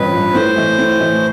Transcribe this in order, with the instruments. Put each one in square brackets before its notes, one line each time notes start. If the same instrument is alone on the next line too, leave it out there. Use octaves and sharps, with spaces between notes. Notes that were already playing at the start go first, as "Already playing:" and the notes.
Already playing: [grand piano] A1 G2 F3 [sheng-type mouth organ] B4
[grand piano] G2 F3
[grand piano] A2 [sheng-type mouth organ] C5
[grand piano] E3 A3
A2
E3 A3